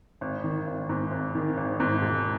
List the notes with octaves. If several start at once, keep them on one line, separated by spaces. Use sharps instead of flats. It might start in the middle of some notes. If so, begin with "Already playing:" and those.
G#1
D#3
G#1
G#2
G#1
D#3
G#1
G#2
E1